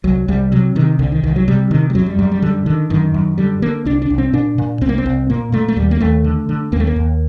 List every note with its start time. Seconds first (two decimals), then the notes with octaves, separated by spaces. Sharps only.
0.04 C2 F#3
0.28 C2 G3
0.52 C3 F#3
0.75 C3 D#3
0.99 C2 D3
1.12 D#3
1.23 C2 D#3
1.36 F#3
1.48 C3 G3
1.71 C3 D#3
1.90 G3
1.95 F#2 F#3
2.06 G3
2.19 F#2 G3
2.31 G3
2.42 D3 G3
2.66 D3 D#3
2.90 F#2 D#3
3.14 F#2
3.38 D3 G3
3.62 D3 A#3
3.85 C2 D4
4.02 D4
4.10 C2
4.18 C4
4.33 A#2 D4
4.58 A#2
4.81 C2 C4
4.89 A#3
4.98 C4
5.06 C2
5.30 A#2 A#3
5.52 A#2 A3
5.68 A3
5.76 D#2 G3
5.91 A#3
6.00 D#2 A3
6.24 D3
6.49 D3
6.72 D#2 A#3
6.80 A3
6.87 A#3
6.96 D#2